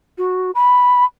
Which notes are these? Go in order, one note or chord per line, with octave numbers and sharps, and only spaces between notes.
F#4
B5